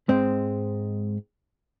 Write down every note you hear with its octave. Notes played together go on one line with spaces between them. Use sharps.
G#2 G#3 C4